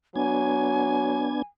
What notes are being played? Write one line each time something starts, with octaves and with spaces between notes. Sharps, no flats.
F#3 B3 D4 G#5 G#6